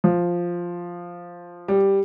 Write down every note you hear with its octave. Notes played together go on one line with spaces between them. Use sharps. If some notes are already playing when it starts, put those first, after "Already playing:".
F3
G3